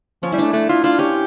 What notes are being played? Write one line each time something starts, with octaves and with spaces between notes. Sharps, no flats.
F3 C#4
G3 E4
A3 D4
A3 D4
E4 F4
D4 F4
C#4 G4